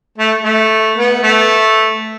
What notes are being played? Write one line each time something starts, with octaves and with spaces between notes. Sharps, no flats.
A3
A3
B3
A3